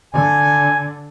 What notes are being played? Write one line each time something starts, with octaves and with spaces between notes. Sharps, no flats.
D3 G#5